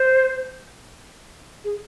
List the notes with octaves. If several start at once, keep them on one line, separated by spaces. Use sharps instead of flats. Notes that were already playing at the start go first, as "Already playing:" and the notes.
Already playing: C5
G#4